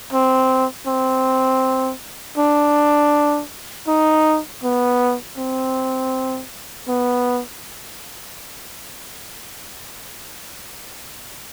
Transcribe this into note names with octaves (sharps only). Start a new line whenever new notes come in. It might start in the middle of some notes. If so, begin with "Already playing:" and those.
C4
C4
D4
D#4
B3
C4
B3